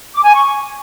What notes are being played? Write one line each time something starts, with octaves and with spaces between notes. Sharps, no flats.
D6
G#5
C#6